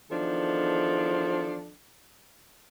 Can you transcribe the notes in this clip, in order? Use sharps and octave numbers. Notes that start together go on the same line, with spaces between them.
E2 D#3 F3 D4 A4